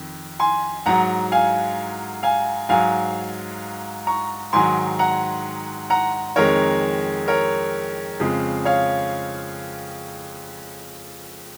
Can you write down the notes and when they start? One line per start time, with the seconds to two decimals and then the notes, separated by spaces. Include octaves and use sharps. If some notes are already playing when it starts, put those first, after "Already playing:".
Already playing: F2 D#3
0.40 G#5 C6
0.86 G#2 F#3 F#5 A#5
1.32 F5 G#5
2.23 F5 G#5
2.69 G#2 F#3 F5 G#5
4.07 A#5 C#6
4.53 G#2 D#3 F#3 G#5 C6
4.99 F#5 A#5
5.90 F#5 A#5
6.36 F2 D#3 G#3 A#4 C#5
7.28 A#4 C#5
8.20 F2 C#3 F3 G#3
8.65 C#5 F5